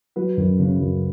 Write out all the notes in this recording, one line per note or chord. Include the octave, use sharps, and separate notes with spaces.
F#3 B4
F#2
C#3
F#2